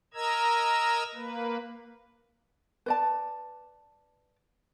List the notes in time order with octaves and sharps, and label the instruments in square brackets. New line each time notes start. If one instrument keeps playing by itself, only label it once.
[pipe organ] A#4 D#5 A#5 E6 G#6
A#3 B4
[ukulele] B4 D5 A5